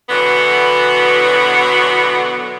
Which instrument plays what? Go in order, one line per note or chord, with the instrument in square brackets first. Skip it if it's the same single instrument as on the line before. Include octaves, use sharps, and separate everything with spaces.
[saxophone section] B2 D3 E3 F#3 B3